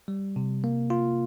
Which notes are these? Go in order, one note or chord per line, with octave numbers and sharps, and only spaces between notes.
G3
C3
A#3
F4